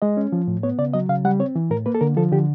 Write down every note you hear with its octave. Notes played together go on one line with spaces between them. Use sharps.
G#3 D#5
C#4
F3
A2
B3 C#5
C#3 D5
F#3 D#5
C#3 F5
G3 F#5
C4 C#5
E3
A2 A#4
A#3 B4
A4
D3 A#4
F3 A4
D3 G4